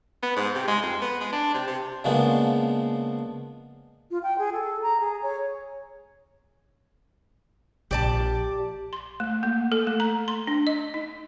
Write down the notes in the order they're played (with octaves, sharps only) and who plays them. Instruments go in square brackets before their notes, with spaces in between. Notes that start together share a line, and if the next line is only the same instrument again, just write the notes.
[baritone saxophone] B3
G#2
C3
G#3
F2
B3
G#3
D4
C3
C3
[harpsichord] C#3 F3 G#3 A#3 B3 D4
[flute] F4
G5
G#4
A4
A#5
G#4
C#5
[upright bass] A#1 [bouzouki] G4 D5 A5
[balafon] C6
A3
A#3
A4
A3
A#5
C6
D4
D#5
D#4